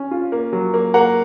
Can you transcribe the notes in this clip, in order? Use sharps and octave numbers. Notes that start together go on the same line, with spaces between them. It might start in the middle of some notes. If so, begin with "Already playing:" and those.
Already playing: C#4
F4
A#3
F#3
A#3
A#3 F#5 A#5